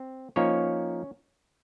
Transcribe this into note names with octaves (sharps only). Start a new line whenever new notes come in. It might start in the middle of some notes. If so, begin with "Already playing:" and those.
Already playing: C4
F3 A#3 C#4 D#4 C#5